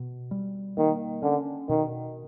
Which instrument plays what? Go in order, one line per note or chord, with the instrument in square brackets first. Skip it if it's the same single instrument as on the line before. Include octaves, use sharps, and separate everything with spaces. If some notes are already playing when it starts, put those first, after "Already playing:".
Already playing: [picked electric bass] B2
G3
[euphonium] D#3 [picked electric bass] A#3
[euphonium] D3 [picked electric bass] C#4
[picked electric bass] B2 [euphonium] D#3